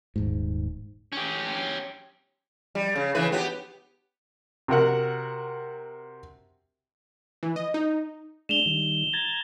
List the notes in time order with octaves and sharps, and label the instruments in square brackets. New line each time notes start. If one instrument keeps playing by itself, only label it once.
[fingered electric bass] D#1 G#2
[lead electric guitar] C#4 G4
[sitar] G3
C#3
C#3 E3 B4
B3 F#4 G4
[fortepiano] C3 F#4 A#4 F#5
[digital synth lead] E3
D#5
D#4
[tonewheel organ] G#3 D4 [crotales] E7 F7 G7
[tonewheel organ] D#3 G3
A#5 G#6 A6